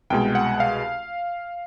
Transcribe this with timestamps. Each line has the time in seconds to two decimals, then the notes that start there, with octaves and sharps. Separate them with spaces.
0.10 C2 B2 G#3 G5
0.35 F#5
0.60 F5